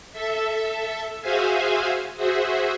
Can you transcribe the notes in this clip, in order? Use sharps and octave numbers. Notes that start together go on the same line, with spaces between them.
A4 E5
F#4 G#4 C5 E5 F5 G#5
F#4 G#4 C5 E5